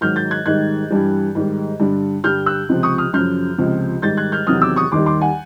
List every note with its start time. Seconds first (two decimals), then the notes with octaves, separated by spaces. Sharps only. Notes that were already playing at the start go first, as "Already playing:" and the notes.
0.01 G#2 D#3 F#3 F6 G6
0.16 G6 A6
0.31 F#6 G#6
0.46 G#2 D#3 G3 F#6 G#6
0.91 G2 E3 G3
1.35 G#2 D#3 G3
1.80 G2 D3 G3
2.24 G2 D3 G3 F6 G6
2.46 E6 F#6
2.69 C#2 C3 F3
2.83 C#6 D#6
2.98 D#6 F6
3.13 F#2 C#3 F3 F6 G6
3.58 C#2 C3 F3
4.02 G#2 D#3 G3 G6 A6
4.17 F#6 G#6
4.32 F6 G6
4.47 E2 C3 D#3 F#3 D#6 F6
4.62 D6 E6
4.76 C#6 D#6
4.92 D#2 D#3 G3 C6 D6
5.06 C6 D6
5.21 F#5 G#5